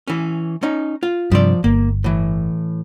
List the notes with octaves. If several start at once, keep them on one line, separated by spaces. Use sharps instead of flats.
E3 C#4
C#4 D#4
F4
G2 C3 F3 C5 D5
G1 A#3
A2 E3